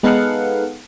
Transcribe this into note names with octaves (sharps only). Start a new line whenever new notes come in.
G#3 B3 D#4 A4 F5 F#5